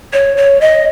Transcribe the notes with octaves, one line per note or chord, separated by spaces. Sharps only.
C#5
C#5
D#5